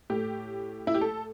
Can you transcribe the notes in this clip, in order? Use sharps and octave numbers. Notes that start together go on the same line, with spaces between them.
A2 A3 G4
E4
G4
A4